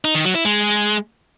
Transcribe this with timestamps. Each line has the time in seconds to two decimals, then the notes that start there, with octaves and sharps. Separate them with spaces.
0.05 D#4
0.15 D#3
0.25 F#3
0.35 E4
0.45 G#3